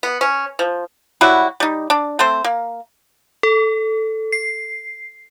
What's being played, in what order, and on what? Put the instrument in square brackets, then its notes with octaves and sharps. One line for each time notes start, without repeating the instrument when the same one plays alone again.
[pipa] B3
C#4
F3
F#3 G3 E4 F#4
G3 D#4
D4
A3 C4 C5
A#3
[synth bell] A4
C7